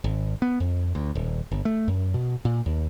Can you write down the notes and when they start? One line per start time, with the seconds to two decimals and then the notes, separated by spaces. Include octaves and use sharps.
0.04 G#1
0.42 B3
0.60 F2
0.95 D2
1.15 D#1
1.51 G1
1.65 A3
1.88 F#2
2.14 B2
2.45 A#2
2.66 D#2